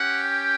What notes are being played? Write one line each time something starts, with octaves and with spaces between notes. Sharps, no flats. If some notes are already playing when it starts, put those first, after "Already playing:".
Already playing: C#4 G4 F#5
G5